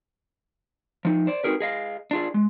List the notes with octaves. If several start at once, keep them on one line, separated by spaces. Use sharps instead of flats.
F3 D#4
C5 D5
C4 D#4 F#4 G#4 A#4 B4
G#4 D#5 F5
D4 F4 G#4
G#3